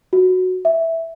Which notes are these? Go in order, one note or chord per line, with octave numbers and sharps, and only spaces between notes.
F#4
E5